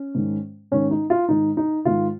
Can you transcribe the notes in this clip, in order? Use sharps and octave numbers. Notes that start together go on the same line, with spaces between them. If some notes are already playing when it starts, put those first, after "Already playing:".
Already playing: C#4
G#2 D#3
G#2 D#3 C#4
D#4
F4
G#2 D#3 D#4
D#4
G#2 D#3 F4